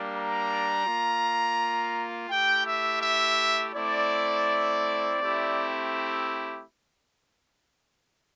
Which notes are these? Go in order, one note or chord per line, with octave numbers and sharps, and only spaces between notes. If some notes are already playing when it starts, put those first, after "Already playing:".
Already playing: G3 A#3 D4
A#5
A#3 F4
A3 E4 G4 G5
E5
E5
A3 C4 E4 D5
A3 C4 E4 G4